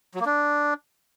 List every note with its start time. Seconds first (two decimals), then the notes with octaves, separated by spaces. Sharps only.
0.15 F#3
0.20 A#3
0.25 D4